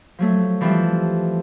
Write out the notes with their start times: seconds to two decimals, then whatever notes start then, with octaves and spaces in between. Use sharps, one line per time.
0.19 F3 F#3 A3
0.61 E3 F3 G3 C4